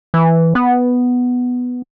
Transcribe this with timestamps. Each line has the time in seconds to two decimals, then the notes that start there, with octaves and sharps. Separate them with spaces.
0.14 E3
0.55 B3